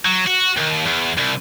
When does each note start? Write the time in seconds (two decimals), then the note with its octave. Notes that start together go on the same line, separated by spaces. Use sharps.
0.05 F#3
0.27 F#4
0.57 D#2
0.87 E2
1.18 C2